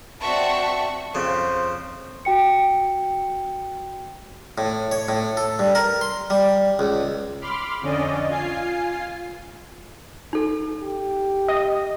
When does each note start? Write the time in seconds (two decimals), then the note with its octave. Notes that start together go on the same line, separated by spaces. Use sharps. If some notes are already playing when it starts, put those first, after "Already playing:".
0.21 C4 D4 F#4 E5 A5 C#6
1.15 F2 C#3 C5
2.25 F#4 G5 C#7
4.58 A2
4.92 C#5
5.09 A2
5.37 A4
5.59 G2
5.75 A#4
6.01 C6
6.30 G3
6.79 C#2
7.41 B5 C6 D6 F6
7.81 F2 D3 C#4 D5 D#5
8.29 F4 G#5 C7
10.33 D#4 A4
10.83 G4
11.48 D#5 D#6